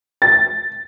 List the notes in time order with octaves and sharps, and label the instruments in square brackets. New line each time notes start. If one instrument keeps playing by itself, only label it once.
[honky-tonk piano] A6